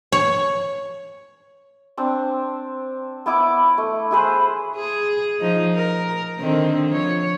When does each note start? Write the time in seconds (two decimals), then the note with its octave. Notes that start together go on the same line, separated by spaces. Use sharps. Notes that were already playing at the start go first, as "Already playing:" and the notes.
0.12 C#5
1.97 C4 D4
3.26 B3 E4 D6
3.78 A3
4.11 E4 G#4 B4 C5
4.76 G#4
5.40 F3 D#4
5.75 A#4
6.39 D3 D#3 C4
6.89 F3 C#5